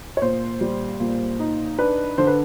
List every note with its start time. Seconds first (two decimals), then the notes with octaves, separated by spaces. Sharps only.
0.17 C#5
0.22 A#2 C5
0.61 G3
1.00 A#2
1.40 D#4
1.79 D4 B4
2.18 D3 C5
2.27 B4